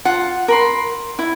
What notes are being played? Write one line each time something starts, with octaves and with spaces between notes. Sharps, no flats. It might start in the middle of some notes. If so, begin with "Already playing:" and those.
F4 F#5
A#4 B5 C6
E4